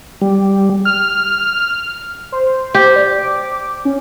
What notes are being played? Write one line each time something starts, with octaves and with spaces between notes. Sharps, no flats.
G3
F6
C5
G4
D5
D6
C#4